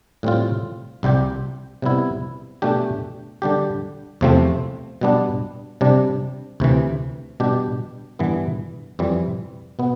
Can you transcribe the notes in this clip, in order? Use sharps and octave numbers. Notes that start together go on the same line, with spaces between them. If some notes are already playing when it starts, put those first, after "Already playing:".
A2 G3 C4 F4
C2 C3 G3 C4 G4
C3 G3 B3 E4
B2 A3 D4 G4
D3 G3 D4 G4
E2 C3 F3 A3 C4
B2 G3 B3 D4
C3 G3 D4
D2 C3 E3
B2 G3 D4 G4
G2 E3 B3 D4
F2 E3 G3
B2 B3